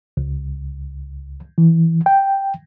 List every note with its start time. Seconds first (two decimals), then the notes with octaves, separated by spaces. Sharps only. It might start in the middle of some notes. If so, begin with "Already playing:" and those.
0.17 C#2
1.58 E3
2.06 G5